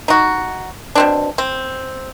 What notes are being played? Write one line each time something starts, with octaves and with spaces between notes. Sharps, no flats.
D#4 F#4
B2 C4 D4
C4